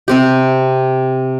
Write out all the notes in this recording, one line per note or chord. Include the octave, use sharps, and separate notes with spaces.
C3 C4 G4